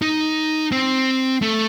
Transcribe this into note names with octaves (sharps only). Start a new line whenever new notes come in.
D#4
C4
A3